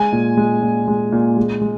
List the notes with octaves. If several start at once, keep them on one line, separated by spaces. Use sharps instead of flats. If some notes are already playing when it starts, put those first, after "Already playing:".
Already playing: G#3 G#5
A#2
G#3
A#2
G#3
A#2
G#3
G#3